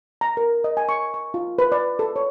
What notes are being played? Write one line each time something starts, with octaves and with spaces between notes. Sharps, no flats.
A#5
A#4
D#5
G#5
C#6
C#6
F4
B4
D5
A4
C#5